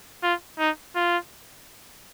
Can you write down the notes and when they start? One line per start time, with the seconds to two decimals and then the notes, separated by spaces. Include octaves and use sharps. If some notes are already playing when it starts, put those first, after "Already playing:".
0.23 F4
0.59 D#4
0.96 F4